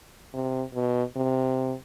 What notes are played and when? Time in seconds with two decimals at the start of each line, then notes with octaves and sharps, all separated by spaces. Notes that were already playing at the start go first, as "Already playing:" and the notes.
0.34 C3
0.74 B2
1.16 C3